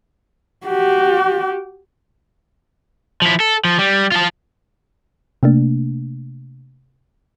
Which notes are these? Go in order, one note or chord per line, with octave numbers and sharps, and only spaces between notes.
F#4 G4
F3 E4
A4
F3
G3
F4 A5
C3 A3 A#3 D4